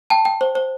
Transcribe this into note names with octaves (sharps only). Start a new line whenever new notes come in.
G5 A5
G5
C5
C5